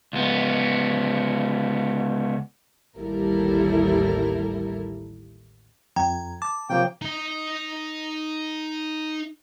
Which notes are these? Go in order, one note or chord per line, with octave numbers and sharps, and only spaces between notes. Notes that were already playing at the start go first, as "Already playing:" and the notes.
C#2 B3
A1 D#2 G3 E4 A4 A#4
F2 G5 A#5 G#6
A5 D6
C3 F3 A#3 C#5 G5
D#4 D#5